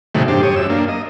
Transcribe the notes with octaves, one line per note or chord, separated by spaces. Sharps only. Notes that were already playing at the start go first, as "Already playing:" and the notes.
A2 C3 D#3 F#3 G#3 A3
G2 D4 G4 C5
G4 C#5 D#6
F#2 E6
A#3 D4
D#5